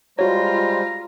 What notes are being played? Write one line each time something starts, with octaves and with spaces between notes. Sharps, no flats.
G3 G#3 F4 F#4 C5 C#5 A#5